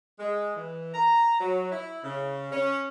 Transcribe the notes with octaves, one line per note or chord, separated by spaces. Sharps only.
G#3
E3
A#5
F#3
E4
C#3
C#4